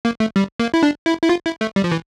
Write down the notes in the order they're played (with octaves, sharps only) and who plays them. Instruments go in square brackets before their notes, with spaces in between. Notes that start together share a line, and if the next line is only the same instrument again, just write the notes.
[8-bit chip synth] A#3
A3
G3
A#3
E4
D4
E4
E4
F4
E4
A3
G3
F3
E3